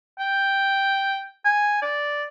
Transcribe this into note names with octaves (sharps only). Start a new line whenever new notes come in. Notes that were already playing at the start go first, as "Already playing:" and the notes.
G5
G#5
D5